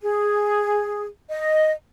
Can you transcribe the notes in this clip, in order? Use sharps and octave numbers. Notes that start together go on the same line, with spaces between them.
G#4
D#5